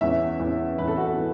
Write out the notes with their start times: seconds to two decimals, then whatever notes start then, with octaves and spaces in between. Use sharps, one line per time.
0.01 E2 E3 C#4 E5
0.40 E2 E3 C#4
0.78 E2 E3 C#4 B4
0.88 A4
0.97 F#4
1.07 A4
1.18 E3